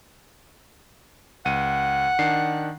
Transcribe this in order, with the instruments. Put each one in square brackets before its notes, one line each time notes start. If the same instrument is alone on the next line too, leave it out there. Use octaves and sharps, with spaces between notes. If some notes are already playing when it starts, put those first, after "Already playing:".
[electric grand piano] C#2 D#7 [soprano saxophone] F#5
[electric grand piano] D#3 D4 C7